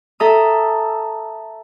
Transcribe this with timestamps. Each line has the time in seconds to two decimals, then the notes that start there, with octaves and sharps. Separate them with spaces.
0.20 A4 E5 A#5 D#6